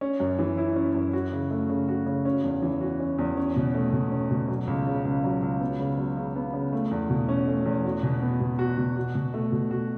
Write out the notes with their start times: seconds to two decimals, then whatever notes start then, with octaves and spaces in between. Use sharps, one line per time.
0.01 C#4
0.20 F#2
0.39 E3
0.57 E4
0.76 C#4
0.95 F#2
1.13 F#4
1.32 C#3
1.51 A3
1.69 C#3
1.88 F#4
2.06 C#3
2.25 C#4
2.44 E2
2.62 E3
2.81 F#4
3.00 C#4
3.19 E2
3.37 C#4
3.56 B2
3.75 A3
3.93 B2
4.12 C#4
4.31 B2
4.49 F#3
4.67 C#2
4.86 C#3
5.05 C#2
5.24 F#3
5.42 C#2
5.61 B3
5.80 C#3
5.98 F#3
6.17 C#3
6.36 B3
6.54 C#3
6.73 A3
6.91 E2
7.10 B2
7.29 C#4
7.47 A3
7.66 E2
7.85 F#4
8.03 B2
8.22 B3
8.40 B2
8.59 F#4
8.78 B2
8.96 F#4
9.15 B2
9.34 A3
9.52 B2
9.71 F#4